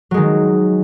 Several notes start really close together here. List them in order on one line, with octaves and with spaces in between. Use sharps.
F#3 G#3 D#3